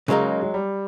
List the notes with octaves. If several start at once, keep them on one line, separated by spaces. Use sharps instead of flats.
C#3 F#3 G#3 A#3 D#4
F#3
G3